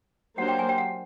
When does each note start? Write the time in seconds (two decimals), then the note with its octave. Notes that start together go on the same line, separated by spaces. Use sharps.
0.38 F#3 A#3 D4 G4 C5 F#5
0.48 G5
0.59 G#5
0.69 G5
0.78 F#5